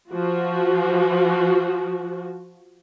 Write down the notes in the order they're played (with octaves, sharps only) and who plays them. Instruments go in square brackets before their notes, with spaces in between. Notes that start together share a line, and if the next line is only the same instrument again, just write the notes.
[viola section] F3 F#4